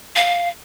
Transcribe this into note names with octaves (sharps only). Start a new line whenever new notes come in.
F5